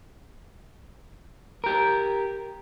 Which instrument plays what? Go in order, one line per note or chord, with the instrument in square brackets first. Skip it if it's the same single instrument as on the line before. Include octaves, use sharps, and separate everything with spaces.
[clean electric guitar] G4 A#4